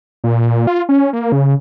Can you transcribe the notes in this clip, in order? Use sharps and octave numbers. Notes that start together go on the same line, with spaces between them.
A#2
F4
C#4
A#3
C#3